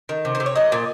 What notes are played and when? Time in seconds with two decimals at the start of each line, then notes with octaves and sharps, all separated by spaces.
0.09 D#3
0.25 C3
0.35 C5
0.40 C3
0.46 C#5
0.56 F#3 D#5
0.72 A#2